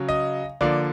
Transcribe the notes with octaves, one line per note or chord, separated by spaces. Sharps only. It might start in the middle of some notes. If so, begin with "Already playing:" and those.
Already playing: C#3 F#3
D#5
D3 F3 A#3 D5